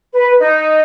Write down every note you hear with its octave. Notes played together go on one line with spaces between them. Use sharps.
B4
D#4